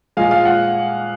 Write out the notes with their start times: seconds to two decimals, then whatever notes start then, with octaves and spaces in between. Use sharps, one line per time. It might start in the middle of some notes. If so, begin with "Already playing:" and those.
0.17 A#2 F3 G#3 F5 G#5
0.31 F5
0.45 F#5